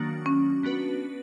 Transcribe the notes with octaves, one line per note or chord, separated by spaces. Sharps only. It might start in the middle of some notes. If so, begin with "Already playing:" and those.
Already playing: D#3 F#3 A#3 D4 F#4
C#4
B3 D4 F#4 B4